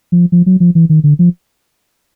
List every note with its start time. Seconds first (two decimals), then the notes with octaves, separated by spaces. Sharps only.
0.12 F3
0.32 F3
0.46 F#3
0.60 F3
0.75 E3
0.89 D#3
1.04 D3
1.19 F3